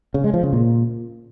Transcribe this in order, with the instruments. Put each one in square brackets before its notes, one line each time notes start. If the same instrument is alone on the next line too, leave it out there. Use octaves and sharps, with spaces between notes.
[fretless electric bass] C#3
G#3
F3
C#3
A#2